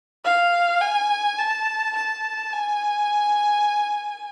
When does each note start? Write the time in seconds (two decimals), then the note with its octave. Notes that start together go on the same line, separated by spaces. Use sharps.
0.25 F5
0.81 G#5
1.39 A5
1.96 A5
2.53 G#5